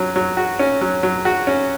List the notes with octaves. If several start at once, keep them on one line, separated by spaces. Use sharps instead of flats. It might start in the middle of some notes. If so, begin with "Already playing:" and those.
Already playing: F#3 C#4
F#3
F#4
C#4
F#3
F#3
F#4
C#4